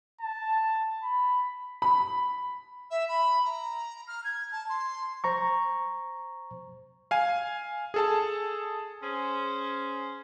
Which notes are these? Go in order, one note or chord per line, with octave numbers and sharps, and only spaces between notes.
A5
B5
B5
E5
B5
A#5
F6
G#6
A5
C6
C5 A#5 C#6
F5 G#5
G#4 A4 A5
C#4 G#4 C5